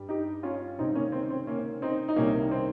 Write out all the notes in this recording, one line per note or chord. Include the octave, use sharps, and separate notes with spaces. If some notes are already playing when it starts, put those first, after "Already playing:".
Already playing: G2 G3
D#4 G4
C#4 F4
C#2 C3 D#3 G3 C4 D#4
A#3 C#4
C4
C4
A#3 C#4
C4 D#4
D#4
C2 C3 D#3 G3 A#3 C#4
C4